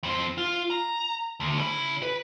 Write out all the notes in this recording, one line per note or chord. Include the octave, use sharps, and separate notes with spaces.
F2 C4
F4
A#5
D2
C#3 E4
B4